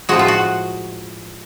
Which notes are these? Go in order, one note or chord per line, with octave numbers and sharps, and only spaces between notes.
A2 F3 G#3 F#4
F4
F#4